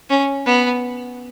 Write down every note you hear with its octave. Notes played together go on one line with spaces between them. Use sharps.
C#4
B3